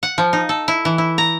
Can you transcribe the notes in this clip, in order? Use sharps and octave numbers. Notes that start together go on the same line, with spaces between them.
F#5
F3
D#4
A4
E4
E3
E4
A#5